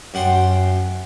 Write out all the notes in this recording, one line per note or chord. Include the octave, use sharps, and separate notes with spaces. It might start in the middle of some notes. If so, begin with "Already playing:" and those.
F#2 F#5 G5 C6